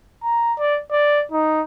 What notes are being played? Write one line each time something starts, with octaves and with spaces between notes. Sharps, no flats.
A#5
D5
D5
D#4